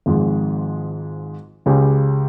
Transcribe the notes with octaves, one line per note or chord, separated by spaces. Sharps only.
G#1 G#2 F3 G#3
C#2 C#3 G#3 C#4 G4